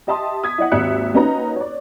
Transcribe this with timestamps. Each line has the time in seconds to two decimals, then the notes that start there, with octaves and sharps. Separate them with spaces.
0.07 G4 D#5 E5 A5 C6 D#6
0.43 D#6 G#6 B6
0.58 E4 D#5 F#5
0.71 G#1 D#2 E5 F#6 C#7
1.14 A#3 C#4 D#4 F#4 B4 A#5
1.56 C#5 D5